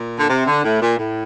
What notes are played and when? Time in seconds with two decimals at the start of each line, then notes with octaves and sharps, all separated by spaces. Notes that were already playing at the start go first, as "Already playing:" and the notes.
Already playing: A#2
0.19 D3
0.29 C3
0.46 D3
0.64 A2
0.82 A#2
0.98 A2